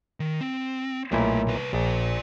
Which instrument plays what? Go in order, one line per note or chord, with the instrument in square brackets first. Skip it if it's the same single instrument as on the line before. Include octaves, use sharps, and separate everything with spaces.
[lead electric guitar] D#3
C4
[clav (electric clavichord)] B1 A#2 E4 [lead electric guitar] A3 G#4
[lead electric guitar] C2 B4
[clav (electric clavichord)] A#1 [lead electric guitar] F4 D5